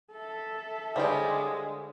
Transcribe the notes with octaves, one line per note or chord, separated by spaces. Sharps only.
A4 E5
D3 G3 G#3 F4 G4 C5 C#5